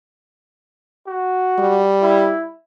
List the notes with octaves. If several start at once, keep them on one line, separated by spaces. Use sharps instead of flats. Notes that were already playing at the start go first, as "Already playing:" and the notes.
F#4
G3
E4